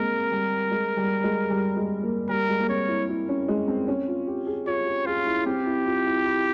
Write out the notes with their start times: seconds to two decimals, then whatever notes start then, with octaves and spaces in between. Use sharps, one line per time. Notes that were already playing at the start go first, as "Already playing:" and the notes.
Already playing: G#3 A#3 C4 A#4
0.31 G3
0.71 G#3
0.97 G3
1.24 G#3
1.50 G3
1.77 G#3
2.03 A#3
2.29 G3 A#4
2.48 G#3
2.60 A#3
2.69 C4 C#5
2.88 E4
3.09 E4
3.29 C#4
3.48 G#3
3.68 C4
3.88 C#4
4.08 F4
4.27 G4
4.47 G#4
4.66 F4 C#5
4.87 G4
5.06 F4 G#4
5.26 E4
5.46 C4 G4
5.66 E4
5.86 F4
6.06 E4
6.25 E4